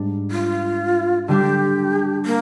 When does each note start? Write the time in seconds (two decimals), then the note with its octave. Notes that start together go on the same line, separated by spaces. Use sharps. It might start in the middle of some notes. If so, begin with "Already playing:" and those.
Already playing: G#2 G3 D4
0.31 F4
1.28 D3 G3 D4 G4
2.26 A#3